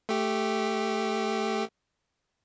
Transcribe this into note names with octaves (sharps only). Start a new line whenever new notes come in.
A3 G4